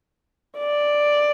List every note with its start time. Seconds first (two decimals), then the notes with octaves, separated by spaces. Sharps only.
0.58 D5